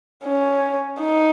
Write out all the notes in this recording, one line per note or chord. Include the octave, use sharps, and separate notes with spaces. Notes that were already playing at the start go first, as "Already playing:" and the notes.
C#4
D#4